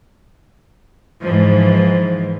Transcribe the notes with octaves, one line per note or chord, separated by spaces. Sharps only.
G#2 E3 F3